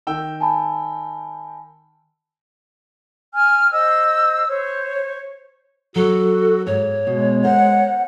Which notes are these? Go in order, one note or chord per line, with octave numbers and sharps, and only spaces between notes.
D#3 G5 E6
G#5 A5 B5
G#5 F6
C5 D#5 E6
C5 C#5
F#3 F#4 A4
G#2 C#5
B2 G#3
A#4 C5 F#5